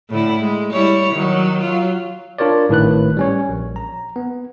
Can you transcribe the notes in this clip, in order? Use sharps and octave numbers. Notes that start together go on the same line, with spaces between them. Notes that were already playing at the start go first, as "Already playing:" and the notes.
A2 D3 E4
G#3
G3 E4 C#5
D#3 F#3
F#3 F4
D4 F4 A#4 C#5 D5
G#1 A2 D#3 B4 F#6
G3 C#4 C#5
A#1
A#5
B3